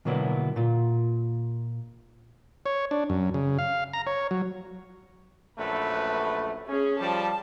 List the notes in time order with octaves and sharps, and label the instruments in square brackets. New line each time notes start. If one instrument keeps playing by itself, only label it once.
[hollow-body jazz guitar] B2 D3 F#3 A#3 B3 E4
A#2 F4
[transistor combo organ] C#5
D4
F#2
C#3
F5
A#5
C#5
F#3
[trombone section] A#1 F#2 A3 [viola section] B4
[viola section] C#4 G#4
[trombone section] F3 G3 [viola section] A5